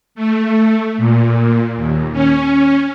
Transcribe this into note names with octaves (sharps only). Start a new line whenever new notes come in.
A3
A#2
D#2
C#4